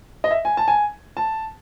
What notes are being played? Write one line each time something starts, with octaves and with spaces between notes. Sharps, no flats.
D#5
E5
G#5
A5
G#5
A5